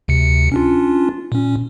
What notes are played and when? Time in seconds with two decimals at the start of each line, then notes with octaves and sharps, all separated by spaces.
0.08 D2 C3 C#7
0.52 C#4 D4 F4
1.32 A#2 C#4